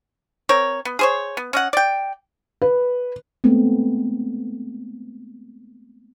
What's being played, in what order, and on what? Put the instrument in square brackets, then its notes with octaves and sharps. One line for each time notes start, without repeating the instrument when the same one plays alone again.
[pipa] C4 A#4 C#5
B3
G#4 C5 C#5
B3
C#4 D#5 F#5
D5 G5
[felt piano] B4
[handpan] G#3 A3 B3 C4